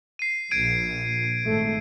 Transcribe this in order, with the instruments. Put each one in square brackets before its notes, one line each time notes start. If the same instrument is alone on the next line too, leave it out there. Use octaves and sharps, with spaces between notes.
[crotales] C7 D#7
[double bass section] A#1 [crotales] G#6 D7 D#7
[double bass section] G#1 A2 A3